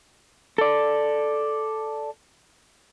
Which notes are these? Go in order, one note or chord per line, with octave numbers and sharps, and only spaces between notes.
A4 D5